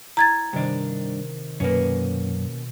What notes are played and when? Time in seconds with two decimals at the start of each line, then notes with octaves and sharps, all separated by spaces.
0.17 E4 A#5 G#6 A6
0.53 G2 C3 D#3 D4
1.60 F#2 B2 A#3 C#4